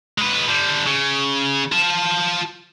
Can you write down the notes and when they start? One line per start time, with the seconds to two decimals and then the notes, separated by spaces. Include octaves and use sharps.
0.18 G#3 B4
0.48 D3 G3
0.86 C#3
1.72 F4 A5